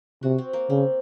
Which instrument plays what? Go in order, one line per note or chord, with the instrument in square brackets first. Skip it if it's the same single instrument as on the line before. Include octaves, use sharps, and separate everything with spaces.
[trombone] C3 [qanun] F#4
[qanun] C4
A#3
[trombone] C#3 [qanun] C4